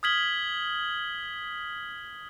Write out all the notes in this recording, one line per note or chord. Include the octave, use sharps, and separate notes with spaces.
D#6 F6 G#6 B6 F#7 G7